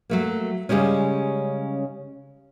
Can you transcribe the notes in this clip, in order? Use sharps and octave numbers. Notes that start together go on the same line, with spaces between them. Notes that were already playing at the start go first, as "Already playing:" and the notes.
F#3 A3 A#3
C#3 E3 G3 G#3 C#4